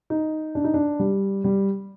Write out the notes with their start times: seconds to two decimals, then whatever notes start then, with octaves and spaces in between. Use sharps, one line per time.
0.10 D#4
0.55 D4
0.64 D#4
0.74 D4
0.99 G3
1.44 G3